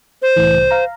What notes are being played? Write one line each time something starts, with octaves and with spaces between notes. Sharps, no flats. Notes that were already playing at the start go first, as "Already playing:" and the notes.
C5
C2 A2 E3
C2
F5 A#5